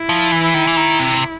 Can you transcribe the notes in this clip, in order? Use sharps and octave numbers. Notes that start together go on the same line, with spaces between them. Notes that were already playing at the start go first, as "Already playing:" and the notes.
Already playing: E4
F3
E3
D#3
E3
D#3
C3